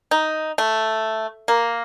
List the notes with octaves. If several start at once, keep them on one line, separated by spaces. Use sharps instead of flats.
D#4
A3
A#3